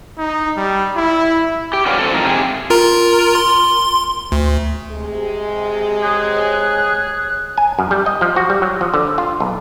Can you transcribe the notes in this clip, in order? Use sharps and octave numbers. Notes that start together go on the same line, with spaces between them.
D#4
G3
E4
G4
F#4 G#4 B4 C#5 D5 F5
C4 A4
G#2 F3 D#4 A#4 D#5 F5
C3 G4 G#4
F4 A#4 A#5
C6
D2
C3 G#3
G#4 C#5 F#6
G#5
F#2
G3
D#5
F3
F#4
G3
F#3
F3
D3
F4
B1